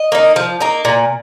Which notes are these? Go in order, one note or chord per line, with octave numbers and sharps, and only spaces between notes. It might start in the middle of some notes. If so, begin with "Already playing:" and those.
Already playing: D#5
A#3 D#4
F3
A#3 D#4
A#2